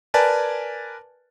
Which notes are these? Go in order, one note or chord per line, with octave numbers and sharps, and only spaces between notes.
A#4 B4 D5 G#5 A5